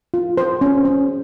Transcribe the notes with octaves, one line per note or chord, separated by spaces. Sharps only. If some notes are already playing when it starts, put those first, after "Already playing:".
F4
C5
C#4
C#4